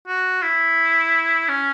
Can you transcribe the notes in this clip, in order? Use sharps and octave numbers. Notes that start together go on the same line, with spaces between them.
F#4
E4
C#4